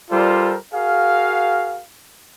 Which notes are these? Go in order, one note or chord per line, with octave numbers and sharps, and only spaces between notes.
G3 F4 A4 A#4 C5 D5
F#4 G#4 A#4 F5